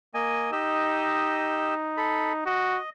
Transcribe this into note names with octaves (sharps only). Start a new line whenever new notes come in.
A#3 D#5 G#5
D#4 G4 D#5 E6
A4 B5
F#4 D#5